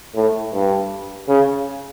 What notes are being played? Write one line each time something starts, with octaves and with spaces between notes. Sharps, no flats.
A2
G2
C#3